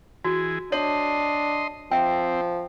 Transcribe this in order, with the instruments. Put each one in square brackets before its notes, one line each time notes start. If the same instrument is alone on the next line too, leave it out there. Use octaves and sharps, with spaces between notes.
[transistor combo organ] E3 G#4 [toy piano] F#4
[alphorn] D4 [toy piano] C#5 [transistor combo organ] D#5 C6
[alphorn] F3 [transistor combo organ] C4 [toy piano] E5 G5